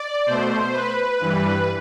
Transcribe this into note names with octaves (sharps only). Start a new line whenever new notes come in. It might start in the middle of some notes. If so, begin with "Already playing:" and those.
Already playing: D5
B2 A3 C5
B4
G2 E3 G3